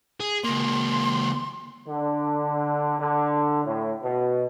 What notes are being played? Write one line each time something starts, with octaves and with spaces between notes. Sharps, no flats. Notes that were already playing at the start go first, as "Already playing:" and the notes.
G#4
C#2 A#3 C6
D3
D3
A2
B2